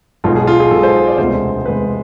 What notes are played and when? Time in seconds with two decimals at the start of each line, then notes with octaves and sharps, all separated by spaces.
0.24 B1 B2 G#3 B3 F4
0.36 G#4
0.47 F4
0.60 G#4
0.71 B1 B2 G#3 B3 A4
0.83 C5
1.07 D5
1.18 E1 D2 C3 G#3 B3 C5
1.66 E1 D2 C3 G#3 B3 B4